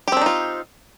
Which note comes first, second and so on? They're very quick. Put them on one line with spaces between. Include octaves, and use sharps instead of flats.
G4 C4 D4 D#4 F4